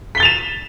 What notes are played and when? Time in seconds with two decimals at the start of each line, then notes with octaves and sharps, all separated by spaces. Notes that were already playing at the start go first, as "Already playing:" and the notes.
0.15 B6
0.17 G7
0.20 A6
0.23 F7
0.25 E7